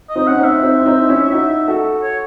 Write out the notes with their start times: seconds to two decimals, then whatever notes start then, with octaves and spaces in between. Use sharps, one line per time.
0.09 D#5
0.16 C4 D#4
0.27 C#4 F#5
0.38 C4 D#4
0.44 E5
0.63 C4 D#4
0.81 E4
0.86 C4 D#4
1.09 C#4 E4
1.32 D#4 F#4
1.68 F#4 A4
2.03 C#5